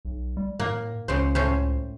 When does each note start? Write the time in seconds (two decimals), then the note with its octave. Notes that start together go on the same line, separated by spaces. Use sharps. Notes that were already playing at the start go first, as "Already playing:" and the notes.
0.05 B1
0.37 G3
0.60 A2 A#3
1.08 C#2 C#3 C5
1.35 A2 C#4 C5